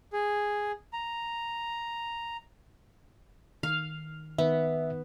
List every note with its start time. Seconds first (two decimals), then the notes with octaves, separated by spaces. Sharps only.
0.13 G#4
0.93 A#5
3.63 D#3 F5
4.38 D#3 B3 D#4 E5